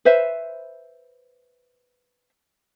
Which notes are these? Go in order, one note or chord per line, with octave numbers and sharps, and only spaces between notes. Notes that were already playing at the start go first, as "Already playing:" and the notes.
B4 C5 E5